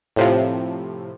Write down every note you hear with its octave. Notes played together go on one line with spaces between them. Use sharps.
A2 C3 F3